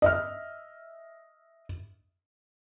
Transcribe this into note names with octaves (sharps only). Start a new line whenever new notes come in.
D#5 E5 F6